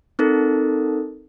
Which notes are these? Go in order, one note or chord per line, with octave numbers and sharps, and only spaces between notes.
C4 D#4 A4 A#4